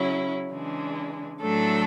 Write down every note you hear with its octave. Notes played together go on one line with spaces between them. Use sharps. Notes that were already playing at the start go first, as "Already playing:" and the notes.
Already playing: C#3 F#3 C#4 E4
C#3 E3 G#3 D4
A2 F#3 A3 D4 A4